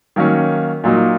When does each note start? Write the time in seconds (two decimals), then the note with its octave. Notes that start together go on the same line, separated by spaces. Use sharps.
0.16 D#3 F#3 A#3 C#4
0.84 A#2 F#3 A#3 D#4